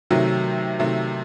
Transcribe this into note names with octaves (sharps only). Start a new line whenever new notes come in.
C3 D#3 F#3 A3
C3 D#3 F#3 A3